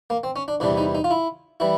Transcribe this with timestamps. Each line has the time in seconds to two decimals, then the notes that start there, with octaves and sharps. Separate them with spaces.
0.10 A#3
0.24 C4
0.36 C#4
0.48 D4
0.60 E2 C3 E3 G3 D4
0.77 D#4
0.95 D#4
1.04 F4
1.11 E4
1.60 E3 G3 E4